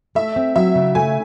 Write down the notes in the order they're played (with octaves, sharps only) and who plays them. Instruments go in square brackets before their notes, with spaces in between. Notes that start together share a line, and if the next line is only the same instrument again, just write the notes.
[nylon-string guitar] A3 [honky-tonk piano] E5
[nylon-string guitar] C4
[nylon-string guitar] F#3 [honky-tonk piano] E5
[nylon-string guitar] C#3
[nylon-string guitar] A3 [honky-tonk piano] G#5